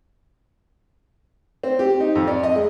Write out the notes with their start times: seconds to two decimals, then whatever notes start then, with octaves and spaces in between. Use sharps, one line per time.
1.63 C4
1.79 G4
2.00 D#4
2.15 F2
2.27 D5
2.43 D#5
2.56 G#3